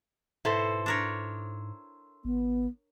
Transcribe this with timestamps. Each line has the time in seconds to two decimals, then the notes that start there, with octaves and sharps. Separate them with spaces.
0.45 G#2 B2 E4 A4 C5
0.86 D4 A#4 C#5
2.25 G#1 B3